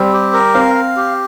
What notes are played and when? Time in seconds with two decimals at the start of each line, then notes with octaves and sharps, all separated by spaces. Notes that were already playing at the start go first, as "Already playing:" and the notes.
Already playing: G3 C4
0.13 G4
0.33 A#4
0.54 C4 F5
0.75 F5
0.96 G4